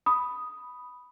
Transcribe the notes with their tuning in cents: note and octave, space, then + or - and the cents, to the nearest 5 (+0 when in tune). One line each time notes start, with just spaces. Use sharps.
B5 +0 D#6 +0